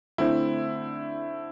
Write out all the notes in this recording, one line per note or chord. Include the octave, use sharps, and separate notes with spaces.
D3 A3 C4 E4